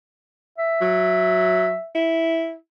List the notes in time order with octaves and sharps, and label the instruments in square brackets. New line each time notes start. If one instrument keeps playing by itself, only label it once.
[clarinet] E5
[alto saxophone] F#3
E4